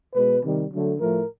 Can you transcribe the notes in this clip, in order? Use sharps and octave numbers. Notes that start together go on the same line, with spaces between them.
B2 G#3 B4
C3 D#3 G3
D3 F#3 A3
A2 F3 A3 A#4